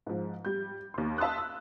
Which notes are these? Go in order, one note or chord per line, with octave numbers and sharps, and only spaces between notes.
G#2 F3
G3 G6
D#2 C6
E5 A5 C6 D#6 F#6
E6